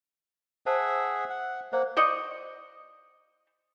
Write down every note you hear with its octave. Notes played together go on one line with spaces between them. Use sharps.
G#4 C5 E5 F#5 A5
F#5
A#3 C5 D5 F#5
C5 D5 D#5 C#6